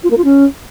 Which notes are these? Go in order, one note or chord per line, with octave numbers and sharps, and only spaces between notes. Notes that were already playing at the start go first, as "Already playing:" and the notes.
F4
A#3
F4
C#4